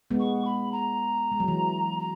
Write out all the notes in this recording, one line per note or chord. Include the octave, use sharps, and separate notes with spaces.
G#3 B3
C#6
B5
A#5
G#3
F#3
E3
A#5